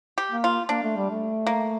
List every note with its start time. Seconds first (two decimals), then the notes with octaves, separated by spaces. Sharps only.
0.18 G4
0.31 A#3
0.44 F4
0.69 A#3 D4
0.83 A3
0.97 G3
1.11 A3
1.47 A#3